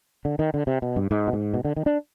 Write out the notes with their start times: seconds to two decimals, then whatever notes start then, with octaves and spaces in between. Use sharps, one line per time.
0.25 D3
0.39 D#3
0.54 D3
0.67 C3
0.82 B2
0.96 G2
1.11 G#2
1.27 B2
1.33 G#2
1.54 B2
1.65 D3
1.76 D#3
1.86 D4